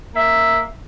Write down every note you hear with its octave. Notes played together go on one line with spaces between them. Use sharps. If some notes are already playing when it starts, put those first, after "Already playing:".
A#3 E5